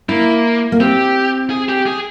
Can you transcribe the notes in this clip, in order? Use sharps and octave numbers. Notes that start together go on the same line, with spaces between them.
A#3 E4
A#3
C4 G4
G#4
G4
G#4